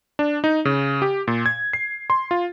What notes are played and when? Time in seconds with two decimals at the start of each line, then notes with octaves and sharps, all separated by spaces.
0.19 D4
0.44 D#4
0.65 C#3
1.02 G4
1.28 A#2
1.46 G#6
1.73 C7
2.10 C6
2.31 F4